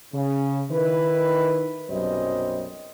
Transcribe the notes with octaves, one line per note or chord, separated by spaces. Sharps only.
C#3
D#3 E4 B4
B1 F#2 C3 G3 C5 D#5